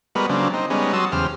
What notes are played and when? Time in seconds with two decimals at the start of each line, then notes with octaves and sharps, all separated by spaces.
0.15 G3 G#3 B3 F#4 A#4 B4
0.29 C#3 F#3 A#3 C4 D4
0.54 C4 D#4
0.70 G3 G#3 B3 C#4 D#4
0.93 F#3 F#4 A5 C6 D#6 E6
1.12 E2 C#3 G4 C5 F6